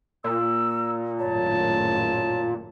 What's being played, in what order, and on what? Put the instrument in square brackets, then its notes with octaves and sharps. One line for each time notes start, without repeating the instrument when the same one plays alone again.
[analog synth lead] A#2 [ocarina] E6
[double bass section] G#1 F#2 A2 [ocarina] C#5 [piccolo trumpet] A5